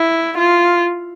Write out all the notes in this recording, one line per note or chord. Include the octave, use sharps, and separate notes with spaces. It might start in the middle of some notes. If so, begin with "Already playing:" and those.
Already playing: E4
F4